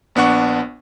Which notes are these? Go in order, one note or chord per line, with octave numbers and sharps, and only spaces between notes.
A#1 B3 D4 F#5 C#6